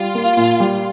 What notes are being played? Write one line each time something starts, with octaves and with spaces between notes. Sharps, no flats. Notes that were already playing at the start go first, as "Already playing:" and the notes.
Already playing: G3 F4
A#3
A#2
G3